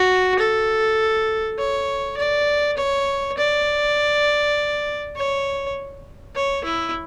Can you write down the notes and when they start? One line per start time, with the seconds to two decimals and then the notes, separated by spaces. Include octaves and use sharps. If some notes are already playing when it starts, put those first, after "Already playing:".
Already playing: F#4
0.39 A4
1.59 C#5
2.17 D5
2.78 C#5
3.38 D5
5.16 C#5
6.36 C#5
6.64 E4